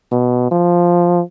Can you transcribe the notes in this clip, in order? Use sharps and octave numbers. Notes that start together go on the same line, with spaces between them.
B2
F3